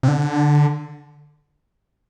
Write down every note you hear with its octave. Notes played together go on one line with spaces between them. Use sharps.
C3
D3